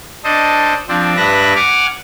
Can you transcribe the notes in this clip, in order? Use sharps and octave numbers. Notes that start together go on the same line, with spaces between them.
D4 A4 C5 D#5
F3 C4 D4
G2 D4 B4 E5 F#6 A#6
F#5 G#5 D6 F6